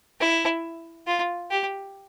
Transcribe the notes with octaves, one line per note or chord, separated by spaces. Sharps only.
E4
F4
G4